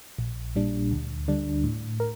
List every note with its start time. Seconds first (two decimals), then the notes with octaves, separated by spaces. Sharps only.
0.19 A#1
0.56 A#2 G3 D4
0.91 D2
1.28 D3 G3 D4
1.64 A2
2.00 A#4